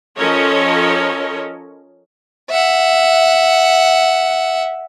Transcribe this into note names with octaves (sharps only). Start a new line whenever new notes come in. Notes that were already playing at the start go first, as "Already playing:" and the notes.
F3 C#4 A4 A#4 C#5 D#5
E5 F#5